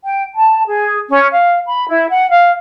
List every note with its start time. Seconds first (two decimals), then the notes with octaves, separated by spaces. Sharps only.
0.04 G5
0.36 A5
0.65 G#4
1.10 C#4
1.31 F5
1.67 B5
1.87 E4
2.11 F#5
2.30 F5